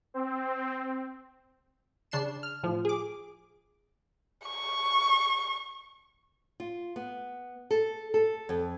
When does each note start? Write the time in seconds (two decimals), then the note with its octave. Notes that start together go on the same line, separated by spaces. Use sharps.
0.14 C4
2.11 C#3 D4 C7 C#7 E7
2.43 F6
2.63 A2 F3
2.85 G#4 D6
4.47 C#6
6.60 F4
6.96 B3
7.71 A4
8.14 A4
8.49 F2